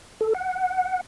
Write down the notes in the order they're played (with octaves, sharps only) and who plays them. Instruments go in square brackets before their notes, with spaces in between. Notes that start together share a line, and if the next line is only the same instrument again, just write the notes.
[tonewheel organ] A4
F#5